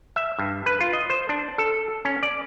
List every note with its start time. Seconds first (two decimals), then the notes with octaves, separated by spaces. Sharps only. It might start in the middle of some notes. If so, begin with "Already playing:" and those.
0.16 E5
0.39 G2
0.66 B4
0.81 F4
0.93 D#5
1.10 C5
1.29 D4
1.58 A4
2.05 C#4
2.23 D5